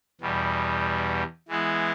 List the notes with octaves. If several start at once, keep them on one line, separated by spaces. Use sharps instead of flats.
E2 B2 G3
E3 G#3 B3 E4